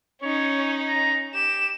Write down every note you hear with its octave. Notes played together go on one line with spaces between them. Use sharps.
C#4 D#4 C#5
A#5
G4 E7